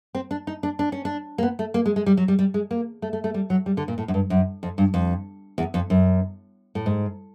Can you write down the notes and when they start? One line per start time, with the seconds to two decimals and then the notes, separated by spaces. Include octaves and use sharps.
0.15 C4
0.31 D4
0.47 D#4
0.63 D4
0.79 D4
0.92 C#4
1.05 D4
1.38 A#3
1.43 B3
1.59 A3
1.74 A#3
1.86 G#3
1.96 G#3
2.06 G3
2.17 F#3
2.28 G3
2.39 G3
2.54 G#3
2.71 A#3
3.02 A3
3.13 A3
3.24 A3
3.34 G3
3.50 F#3
3.66 G3
3.77 D3
3.88 A#2
3.98 A2
4.08 F#2
4.14 G2
4.30 F#2
4.63 F2
4.78 G2
4.94 F2
5.58 E2
5.74 F2
5.90 F#2
6.75 A2
6.86 G#2